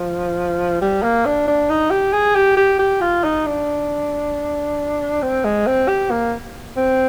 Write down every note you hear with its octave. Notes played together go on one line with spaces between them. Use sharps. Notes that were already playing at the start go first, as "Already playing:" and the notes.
Already playing: F3
G3
A#3
D4
D4
D#4
G4
G#4
G4
G4
G4
F4
D#4
D4
C4
G#3
C4
G4
A#3
C4